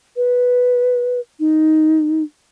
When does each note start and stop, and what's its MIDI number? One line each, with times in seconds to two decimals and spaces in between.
0.16 1.20 71
1.40 2.23 63